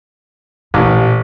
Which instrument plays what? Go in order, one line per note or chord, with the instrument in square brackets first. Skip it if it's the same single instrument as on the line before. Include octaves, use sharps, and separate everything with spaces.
[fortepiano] A1 [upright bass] A#2 D3